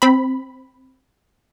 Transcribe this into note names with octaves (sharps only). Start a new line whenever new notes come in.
C4 B5